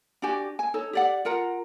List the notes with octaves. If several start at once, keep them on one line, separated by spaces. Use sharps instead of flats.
D4 F#4 G4 G#5
G#5
D#4 A4 C#5
G4 D5 F#5
F4 A#4 F#5 A#5